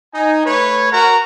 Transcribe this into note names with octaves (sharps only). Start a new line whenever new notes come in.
D#4 G#5
A3 B4 C#5
F#4 A#4 F#5 A#5